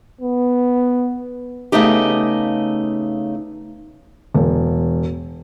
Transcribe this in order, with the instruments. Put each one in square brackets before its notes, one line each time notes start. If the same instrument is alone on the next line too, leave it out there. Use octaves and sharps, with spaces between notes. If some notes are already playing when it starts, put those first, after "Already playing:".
[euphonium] B3
[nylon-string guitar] C#3 G3 A3 B3 D#4 G4
[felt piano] E1